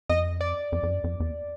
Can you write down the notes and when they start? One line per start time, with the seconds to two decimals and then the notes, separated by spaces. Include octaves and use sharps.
0.09 F2 D#5
0.41 D5
0.72 F2
0.83 F2
0.88 F#2
1.04 F2
1.20 E2